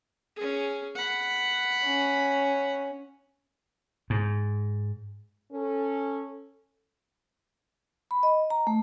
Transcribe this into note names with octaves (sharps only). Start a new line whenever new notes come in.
C#4 G#4
F#5 B5
C#4
G#2
C#4 A4
B5
D#5
A#5
A3